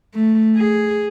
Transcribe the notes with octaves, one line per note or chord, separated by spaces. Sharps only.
A3
G#4